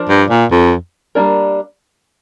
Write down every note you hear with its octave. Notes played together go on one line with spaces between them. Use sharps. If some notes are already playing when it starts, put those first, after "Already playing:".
Already playing: F3 D4 A#4 D5
G2
A#2
F2
G3 A#3 D4 A#4